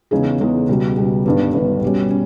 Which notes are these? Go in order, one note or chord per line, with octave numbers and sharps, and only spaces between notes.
E2 C#3 G#3 D#4 G#4
E2 C#3 G#3 D#4 G#4
C#2 B2 G3
C#2 B2 G3
G1 G2 D#3 G3 B3
G1 G2 D#3 G3 B3
B2 G3 C#4
C#4